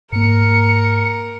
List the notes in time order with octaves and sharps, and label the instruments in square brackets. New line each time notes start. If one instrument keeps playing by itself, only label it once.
[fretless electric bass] G#2 A#3 [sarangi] A#4 [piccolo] C#7